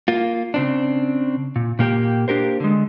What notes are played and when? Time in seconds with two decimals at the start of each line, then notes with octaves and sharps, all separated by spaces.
0.08 A#3 F4
0.54 C#3 C4 D4
1.56 A#2
1.79 A#2 A#3 G4 A4 G5
2.28 A#3 D4 G4 A#4 C5
2.60 D3 G#3